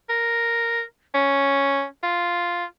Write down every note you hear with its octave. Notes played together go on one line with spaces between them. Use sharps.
A#4
C#4
F4